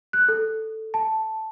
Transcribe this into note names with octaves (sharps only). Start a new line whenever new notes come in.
F#6
A4
A5